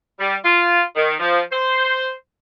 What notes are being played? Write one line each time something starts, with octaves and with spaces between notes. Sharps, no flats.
G3
F4
D#3
F3
C5